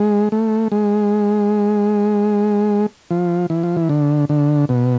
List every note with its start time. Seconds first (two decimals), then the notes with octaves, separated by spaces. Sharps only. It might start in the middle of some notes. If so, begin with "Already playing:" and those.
Already playing: G#3
0.32 A3
0.72 G#3
3.11 F3
3.50 E3
3.63 F3
3.77 E3
3.89 D3
4.29 D3
4.69 B2